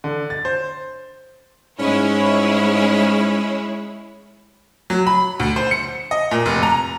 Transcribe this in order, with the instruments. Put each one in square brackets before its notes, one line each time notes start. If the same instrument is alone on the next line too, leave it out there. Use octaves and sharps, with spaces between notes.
[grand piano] D3
A6
C5
[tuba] G#2 [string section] G#3 E4 C#5 [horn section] C#4
[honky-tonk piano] F#3
B5
D2
C5
C#7
D#5
A#2
F1
A#5